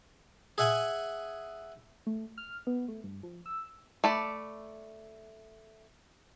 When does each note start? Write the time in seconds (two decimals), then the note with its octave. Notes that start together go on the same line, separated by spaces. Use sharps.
0.58 G#4 E5 F#5 G#5
2.07 A3
2.38 F6
2.67 B3
2.88 A3
3.04 G2
3.23 F3
3.46 E6
4.04 A3 D5 B5